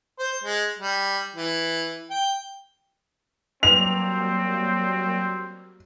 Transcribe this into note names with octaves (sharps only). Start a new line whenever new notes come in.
C5
G#3
G3
E3
G5
F#3 G3 A#3 C4 F7